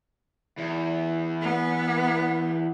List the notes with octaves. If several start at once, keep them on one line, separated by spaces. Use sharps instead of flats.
E2
B3